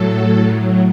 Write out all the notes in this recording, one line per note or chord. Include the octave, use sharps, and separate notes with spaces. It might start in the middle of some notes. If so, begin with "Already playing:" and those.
Already playing: A2 F#3 A4
A2 F#3